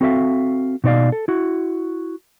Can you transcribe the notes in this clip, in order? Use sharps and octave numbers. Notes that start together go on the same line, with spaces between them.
C4 F#4 A4 C#5 E5 F5
B2 D#4 C#5 D5 F5
A4
E4 F#4